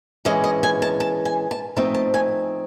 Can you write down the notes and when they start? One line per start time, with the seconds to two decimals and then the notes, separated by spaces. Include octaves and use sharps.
0.25 E3 G#3 C#4 D#5
0.44 D#5
0.63 G#5
0.82 A5
1.00 A5
1.25 G#5
1.51 A5
1.76 F3 A3 C4 D#4 A5
1.94 A5
2.14 G#5